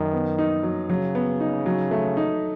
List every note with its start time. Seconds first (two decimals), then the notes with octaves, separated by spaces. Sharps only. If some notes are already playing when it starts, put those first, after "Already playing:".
Already playing: F#2 D#3
0.13 B3
0.38 D#4
0.63 F#3
0.89 C#3 F#3
1.15 B3
1.40 D#4
1.66 F#3
1.91 A3
2.17 D#4